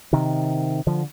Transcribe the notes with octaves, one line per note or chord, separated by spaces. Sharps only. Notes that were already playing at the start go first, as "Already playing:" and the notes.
C3 D#3
D3 F3